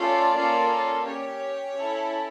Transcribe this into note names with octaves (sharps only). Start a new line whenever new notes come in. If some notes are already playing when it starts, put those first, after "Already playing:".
Already playing: A3 C#4 F4 A4 D5
A#3 C#4 F4 A4
C#4 G4 C#5
C#4 E4 A4